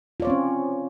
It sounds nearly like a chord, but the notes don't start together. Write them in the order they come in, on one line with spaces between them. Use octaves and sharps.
F4 D5 C#5 C4 C#4